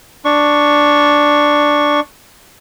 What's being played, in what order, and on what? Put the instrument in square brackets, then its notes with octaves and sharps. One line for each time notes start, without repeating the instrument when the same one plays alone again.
[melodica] D4 C#6